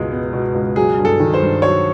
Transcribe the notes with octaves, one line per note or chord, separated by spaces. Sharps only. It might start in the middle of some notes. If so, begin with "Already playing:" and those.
Already playing: C#2 B2 G#3
B3
B2
C#2
F#3 G#4
G2
A4
D#3
C5
G2
F#3 C#5